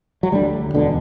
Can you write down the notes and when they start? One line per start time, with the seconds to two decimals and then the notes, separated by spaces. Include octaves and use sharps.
0.23 F#3
0.32 D2 D3 G3
0.74 E1 B2 D3